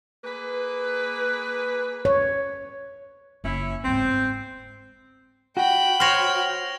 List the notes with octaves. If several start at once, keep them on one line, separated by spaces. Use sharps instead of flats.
A#3 G#4 B4
C#5
F#1 C#4 E4
G1 G#2 C4
F#4 G5 B5
C5 C#5 F6 A#6 F7